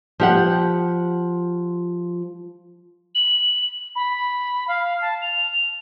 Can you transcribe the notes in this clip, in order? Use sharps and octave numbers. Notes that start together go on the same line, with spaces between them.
F3 G4 F#5
F#7
B5
F5
A5
F7